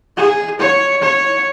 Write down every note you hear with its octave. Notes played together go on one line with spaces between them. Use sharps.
G#4
C#5
C#5